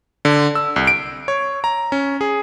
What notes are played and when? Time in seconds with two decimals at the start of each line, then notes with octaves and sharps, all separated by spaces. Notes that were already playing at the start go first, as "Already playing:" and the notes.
0.25 D3
0.55 E6
0.76 C2
0.87 D7
1.28 C#5
1.64 A#5
1.92 C#4
2.21 G#4